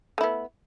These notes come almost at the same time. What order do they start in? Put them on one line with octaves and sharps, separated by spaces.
A3 E4 B3